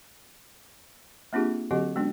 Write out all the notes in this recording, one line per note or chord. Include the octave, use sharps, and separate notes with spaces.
A#3 C4 D4 F4 G4 G#4
D3 F#3 C4 F#4 G4 D#5
G#3 B3 C#4 D4 F#4